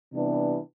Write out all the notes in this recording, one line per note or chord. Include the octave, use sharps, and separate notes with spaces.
C3 E3 G3 B3 D4